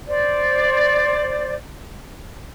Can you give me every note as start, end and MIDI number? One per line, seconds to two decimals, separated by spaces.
0.08 1.55 72
0.08 1.55 74